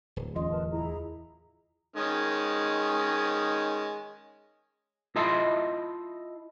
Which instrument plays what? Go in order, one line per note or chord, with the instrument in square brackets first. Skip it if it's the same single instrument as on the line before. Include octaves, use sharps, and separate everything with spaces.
[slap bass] D1
[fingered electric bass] E2 [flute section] C#4 C6 [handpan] F4 D#5
[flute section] A#4 B4 A5
E4 G#4 A#5
[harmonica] D#3 G#3 C#4
[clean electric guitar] E4 F4 D#5 E5 A5 C6